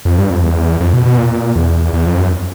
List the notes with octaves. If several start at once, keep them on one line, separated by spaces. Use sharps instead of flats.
F2
G2
F2
E2
F2
B2
B2
A#2
E2
E2
F2
F#2